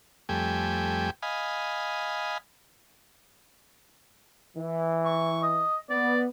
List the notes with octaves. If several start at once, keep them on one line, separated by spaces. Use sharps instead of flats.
F2 G3 A3 G5 G#5
D#5 F5 G#5 B5
E3
C#6
D#5
B3 D5